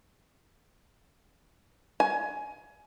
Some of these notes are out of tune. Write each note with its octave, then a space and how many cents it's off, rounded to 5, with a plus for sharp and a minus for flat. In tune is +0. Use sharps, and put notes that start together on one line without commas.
G#5 +20